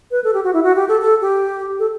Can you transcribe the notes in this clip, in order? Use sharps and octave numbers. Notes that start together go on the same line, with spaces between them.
B4
A4
G4
F#4
E4
F#4
G4
A4
A4
G4
A4